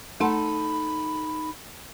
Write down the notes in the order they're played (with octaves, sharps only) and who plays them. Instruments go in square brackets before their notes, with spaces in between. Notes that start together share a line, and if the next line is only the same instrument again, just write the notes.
[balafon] A3 F#5 C6 [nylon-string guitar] D#4 A4 A5 [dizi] B5